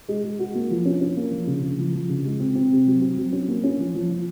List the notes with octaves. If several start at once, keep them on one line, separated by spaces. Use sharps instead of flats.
G#3
G#3
F#4
A#3
F3
C#4
C#4
A#3
F3
C#3
C#3
F3
F3
C#3
G#3
C4
C4
C3
F#3
C4
F#3
C#4
A#3
C#4
F3
F3
F3